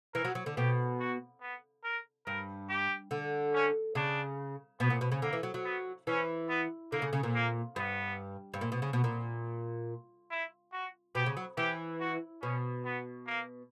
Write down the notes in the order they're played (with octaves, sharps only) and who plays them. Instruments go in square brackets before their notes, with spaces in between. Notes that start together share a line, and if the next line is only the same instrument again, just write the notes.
[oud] E3 [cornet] A#4
[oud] F#3
F#3
D3
[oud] B2 [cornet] G4
[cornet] F#4
B3
A#4
[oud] G2 [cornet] A#4
[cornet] G4
[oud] D3
[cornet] C#4
[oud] C#3 [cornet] D4
[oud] B2 [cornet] B3
[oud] A#2
B2
C#3
[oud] D3 [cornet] A#3
[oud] E3
F#3
F#3
[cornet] B3
[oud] E3 [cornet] C#4
[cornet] B3
[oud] D3 [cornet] A#3
[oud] C#3
C#3
A#2
[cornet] A#3
[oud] G2 [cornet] B3
[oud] G2
A#2
B2
C#3
B2
A#2
[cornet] E4
F#4
[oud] B2 [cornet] G4
[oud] C#3
F#3
[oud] E3 [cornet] G4
[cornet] F#4
[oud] B2 [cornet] C#4
[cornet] B3
A#3